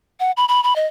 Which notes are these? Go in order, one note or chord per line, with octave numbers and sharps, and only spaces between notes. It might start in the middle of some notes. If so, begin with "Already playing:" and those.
F#5
B5
B5
B5
D#5